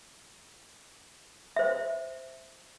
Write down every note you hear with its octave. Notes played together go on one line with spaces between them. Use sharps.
C5 E5